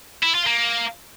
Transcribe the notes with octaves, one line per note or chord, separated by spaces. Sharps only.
E4
F4
A#3